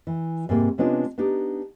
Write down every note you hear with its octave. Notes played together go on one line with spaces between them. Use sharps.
E3
G#2 C3 G3 A#3
C3 G#3 B3 C#4 D4 F4
B3 D4 D#4 G4